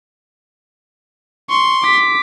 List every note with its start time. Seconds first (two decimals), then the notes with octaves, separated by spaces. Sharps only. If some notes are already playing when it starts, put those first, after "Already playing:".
1.50 C6 C#6
1.83 D6 B6